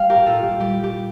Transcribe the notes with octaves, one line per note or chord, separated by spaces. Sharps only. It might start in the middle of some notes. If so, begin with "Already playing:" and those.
Already playing: G3 F5 G5
G4 A#4
A#2
F4 A4
A#2 G4
G3 G4
G3 G4